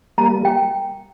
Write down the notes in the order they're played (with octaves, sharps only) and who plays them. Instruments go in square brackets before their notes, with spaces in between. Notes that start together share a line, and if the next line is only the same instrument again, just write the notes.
[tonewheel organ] G3 A#3 [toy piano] A#5
[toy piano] G5